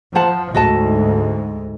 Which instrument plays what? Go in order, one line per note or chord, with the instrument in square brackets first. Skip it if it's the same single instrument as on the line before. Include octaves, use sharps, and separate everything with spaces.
[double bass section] F3 [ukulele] C5 F#5 A5
[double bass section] D2 G#2 [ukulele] F#4 D#5 A5